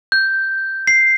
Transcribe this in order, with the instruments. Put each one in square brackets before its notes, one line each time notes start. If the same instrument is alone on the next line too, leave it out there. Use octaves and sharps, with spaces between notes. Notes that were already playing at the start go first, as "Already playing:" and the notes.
[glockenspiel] G6
C7